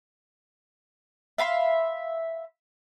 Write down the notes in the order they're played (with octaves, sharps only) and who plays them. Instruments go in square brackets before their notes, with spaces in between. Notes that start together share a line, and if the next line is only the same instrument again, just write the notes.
[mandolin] E5 F5 B5 C6